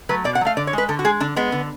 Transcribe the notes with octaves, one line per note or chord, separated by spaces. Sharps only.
F#3 A3 B4
B2 D5
F#5
F#3
A3 F5
D3 D5
C#5
G#3 B4
D3 A4
F#4
G#3 G#4
D3 D4
G#3 B3
D3